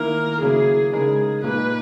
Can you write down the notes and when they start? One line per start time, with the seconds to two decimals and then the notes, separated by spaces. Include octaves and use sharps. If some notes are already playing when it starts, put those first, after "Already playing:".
Already playing: D#3 A#3 E4 A#4
0.41 C#3 F#3 A#3 E4 G#4
0.93 C#3 G#3 D#4 G#4 A#4
1.43 A#2 A#3 D#4 B4